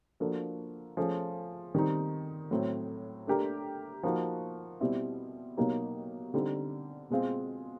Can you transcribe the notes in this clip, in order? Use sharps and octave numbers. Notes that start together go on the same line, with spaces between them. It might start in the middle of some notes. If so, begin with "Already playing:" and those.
F3 A#3 D4 F#4 A4
F3 A3 C#4 F4 G#4
D#3 G3 C4 D#4
A2 F#3 A3 C4
A3 D4 G4 A#4
F3 A#3 D#4 F#4
B2 G3 C4 E4
B2 F#3 A#3 D#4 G4
D3 G3 C4 D#4
B2 G#3 C4 F4